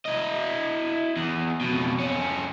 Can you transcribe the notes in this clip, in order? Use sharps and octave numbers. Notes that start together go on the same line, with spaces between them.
E4 D#5
E2
F2 B2
F2 C#4